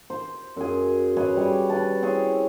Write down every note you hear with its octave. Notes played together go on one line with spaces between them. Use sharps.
C5
F#2 G#4
G#4 B4 C#5 E5
G3 C#5
B4 A5
C4 E4 G#4 C#5